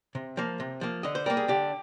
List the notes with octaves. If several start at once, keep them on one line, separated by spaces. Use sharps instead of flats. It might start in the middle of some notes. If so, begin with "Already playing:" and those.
C3
F3 A#3
C3
F3 A#3
D3 D#5
C5
G3 A#3 A#4
G#4
D3 G4